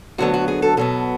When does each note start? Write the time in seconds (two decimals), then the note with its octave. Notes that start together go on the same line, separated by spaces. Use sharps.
0.18 D2 D3 F#3 B3 F#4
0.34 F#4
0.48 G#4
0.62 A4
0.77 B2 F#3 B3 A4